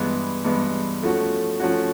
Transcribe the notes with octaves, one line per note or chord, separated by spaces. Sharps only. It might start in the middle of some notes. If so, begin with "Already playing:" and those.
Already playing: G2 E3 G#3 B3
G2 E3 G#3 B3
F3 A3 C#4 F#4
F3 A3 C#4 F#4